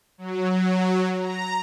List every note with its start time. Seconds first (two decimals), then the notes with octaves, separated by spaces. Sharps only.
0.18 F#3
0.50 F#3
1.19 A#5